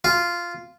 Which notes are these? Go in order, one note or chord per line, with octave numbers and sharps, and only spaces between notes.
F4